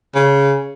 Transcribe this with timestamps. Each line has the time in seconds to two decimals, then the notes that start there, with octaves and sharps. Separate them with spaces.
0.14 C#3